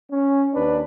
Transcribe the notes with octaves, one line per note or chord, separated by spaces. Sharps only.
C#4
D#2 D4 B4